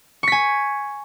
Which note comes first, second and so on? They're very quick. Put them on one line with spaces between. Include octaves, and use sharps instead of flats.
C#6 B6 G#5